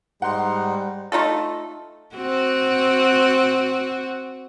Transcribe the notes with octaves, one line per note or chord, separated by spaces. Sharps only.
G#2 G3 D#4 F#5 C6
A3 D#4 F4 A4
C4 F#4